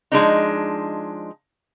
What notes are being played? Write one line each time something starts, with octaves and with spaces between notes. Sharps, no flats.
F3 G#3 D4 D#4